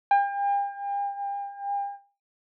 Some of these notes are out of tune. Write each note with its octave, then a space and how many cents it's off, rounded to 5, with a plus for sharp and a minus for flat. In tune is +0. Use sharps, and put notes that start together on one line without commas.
G5 +40